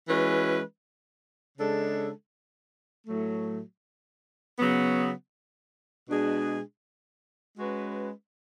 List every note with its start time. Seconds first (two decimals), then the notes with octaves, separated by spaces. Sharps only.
0.08 E3 G#3 C#4 F#4 B4
1.58 C#3 G#3 D4 A4
3.07 A2 F#3 A3
4.58 C#3 F#3 B3
6.08 B2 G#3 D4 G#4
7.58 G#3 C#4 F#4 B4